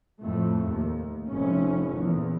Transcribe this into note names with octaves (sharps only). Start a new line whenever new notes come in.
F2 A2 A3
D#2
F1 C#4
E2 A#2